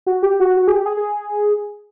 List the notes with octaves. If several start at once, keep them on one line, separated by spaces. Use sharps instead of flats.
F#4
G4
F#4
F#4
G#4
G4
G#4
G#4